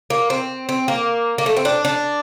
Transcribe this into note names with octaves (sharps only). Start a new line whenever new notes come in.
A#3
C4
C4
A#3
A#3
A3
C4
D4
D4